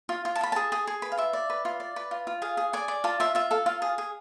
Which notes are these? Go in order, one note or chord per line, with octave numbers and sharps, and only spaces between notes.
F4
F4
A5
F4 B5
G#4 A5
G#4
G#4
B4
F5
F4 E5
D5
B4
F4
D5
B4
F4
F4
G#4 F5
G#4
D5 G#5
D5
F4 A5
F4 E5
F4 E5
A4 F5
F4 F5
G#4
G#4